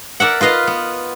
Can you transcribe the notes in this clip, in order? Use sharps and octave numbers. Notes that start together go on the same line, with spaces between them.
A#4 D5 E5 F#5
F4 B4 D#5 F5
B3